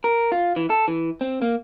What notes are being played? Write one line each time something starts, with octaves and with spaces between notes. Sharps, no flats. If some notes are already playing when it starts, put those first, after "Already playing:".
A#4
F4
E3
A4
E3
C4
A#3